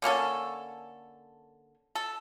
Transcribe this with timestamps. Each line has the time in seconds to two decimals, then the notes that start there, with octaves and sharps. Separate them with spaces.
0.02 D3 A#3 C#4 A4
1.95 A4